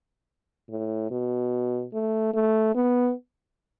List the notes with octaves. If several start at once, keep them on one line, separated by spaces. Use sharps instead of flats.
A2
B2
A3
A3
B3